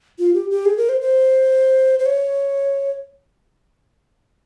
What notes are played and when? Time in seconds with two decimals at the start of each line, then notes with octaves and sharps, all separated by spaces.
0.19 F4
0.34 G4
0.50 G4
0.65 G#4
0.78 A#4
0.89 C5
1.01 C5
1.99 C5
2.06 C#5